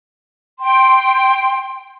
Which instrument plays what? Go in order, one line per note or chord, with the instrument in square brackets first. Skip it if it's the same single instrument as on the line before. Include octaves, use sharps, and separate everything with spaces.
[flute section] G5 C6